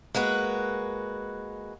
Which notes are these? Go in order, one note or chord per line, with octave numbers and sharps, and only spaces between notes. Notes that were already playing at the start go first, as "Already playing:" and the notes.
G#3 A#3 F#4 B4